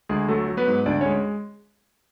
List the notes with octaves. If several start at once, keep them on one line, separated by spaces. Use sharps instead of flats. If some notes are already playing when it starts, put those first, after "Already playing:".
D2 G#3 G#4
F#3 A3 A4
F#3
B3 B4
G#2
D2 D4 D5
G#3 C#4 C#5